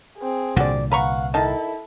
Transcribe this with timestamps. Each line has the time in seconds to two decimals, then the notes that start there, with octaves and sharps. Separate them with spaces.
0.19 C4 G#4
0.56 C2 A#2 D3 F#4 D5
0.92 B4 F5 F#5 A#5 C#6
1.34 D#3 D#4 E4 A4 A5